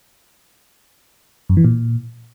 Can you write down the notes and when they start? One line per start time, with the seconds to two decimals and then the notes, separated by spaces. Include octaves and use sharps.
1.49 F#2
1.57 E3
1.64 A#2